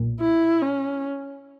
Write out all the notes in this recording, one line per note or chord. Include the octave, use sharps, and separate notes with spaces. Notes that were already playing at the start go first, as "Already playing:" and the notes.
Already playing: B1 A#2
E4
C#4